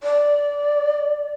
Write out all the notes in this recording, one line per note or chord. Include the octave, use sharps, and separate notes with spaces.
D5